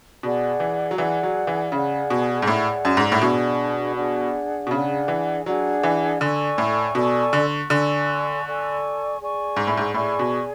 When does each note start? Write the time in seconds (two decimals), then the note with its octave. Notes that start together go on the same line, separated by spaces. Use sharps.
0.23 B2 G#4 D5 F#5
0.60 E3
0.91 F#3
0.97 E3 G#4 D5 F#5
1.23 F#3
1.47 E3
1.72 C#3 G#4 D5 F#5
2.10 B2
2.42 G#2
2.47 A2 G#4 D5 F#5
2.85 F#2
2.97 G#2
3.12 A2
3.21 B2 D4 G#4 D5 F#5
3.96 D4 G#4 D5 F#5
4.67 B2
4.71 C#3 D4 G#4 D5 F#5
5.08 E3
5.46 F#3 D4 G#4 D5 F#5
5.83 E3
6.21 D3 A4 D5 G#5 C#6
6.58 A2
6.95 B2 A4 D5 G#5 C#6
7.33 D3
7.70 D3 A4 D5 G#5 C#6
8.45 A4 D5 G#5 C#6
9.19 G#4 D5 G#5 C#6
9.56 G#2
9.67 A2
9.77 G#2
9.94 A2 G#4 D5 G#5 C#6
10.19 B2